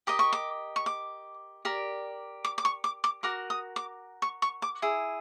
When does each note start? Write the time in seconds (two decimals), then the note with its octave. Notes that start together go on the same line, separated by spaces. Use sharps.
0.07 G4 A#4 D#5 D6
0.19 C#6
0.33 D6
0.76 C#6
0.86 D6
1.65 G4 A#4 D5
2.45 D6
2.58 D6
2.65 C#6
2.84 D6
3.04 D6
3.23 F#4 A#4 D6
3.50 D#6
3.76 D6
4.22 C#6
4.42 C#6
4.62 D6
4.82 E4 G#4